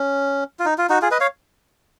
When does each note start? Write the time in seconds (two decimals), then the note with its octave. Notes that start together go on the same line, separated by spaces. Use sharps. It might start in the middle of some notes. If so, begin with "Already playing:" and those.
Already playing: C#4
0.59 F4
0.65 D#4
0.78 F4
0.90 D#4 F#4
1.02 F4 G#4
1.11 B4 D#5
1.20 C#5 F5